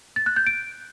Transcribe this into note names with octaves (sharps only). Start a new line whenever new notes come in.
A6
F#6
G6
D7